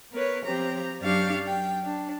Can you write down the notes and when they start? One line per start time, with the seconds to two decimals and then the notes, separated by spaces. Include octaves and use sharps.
0.12 B3 A#4 B4 C#5
0.45 F3 C4 G4 A#5
1.00 F#2 F#3 D4 G4 F5 C#6
1.46 G5
1.83 D4